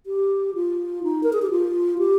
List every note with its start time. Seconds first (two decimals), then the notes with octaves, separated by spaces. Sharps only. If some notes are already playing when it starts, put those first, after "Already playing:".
0.06 G4
0.55 F4
1.03 D#4
1.23 A#4
1.33 G#4
1.42 G4
1.50 F4
1.99 G4